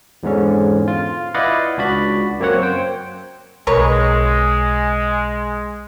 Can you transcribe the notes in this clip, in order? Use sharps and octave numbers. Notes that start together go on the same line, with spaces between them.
E2 G#2 D3 C#4
F4
E4 B4 D5 D#5 F5 F#5
C#2 D4 F#4 D5 B5
F#2 A#3 C4 C#5 F#5
C5 G5
B1 C#3 G#3 A#4 B4 C#5